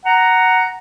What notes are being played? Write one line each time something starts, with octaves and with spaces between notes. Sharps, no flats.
F#5 A#5